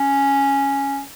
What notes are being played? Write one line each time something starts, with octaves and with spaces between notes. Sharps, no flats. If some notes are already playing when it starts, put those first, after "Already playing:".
Already playing: C#4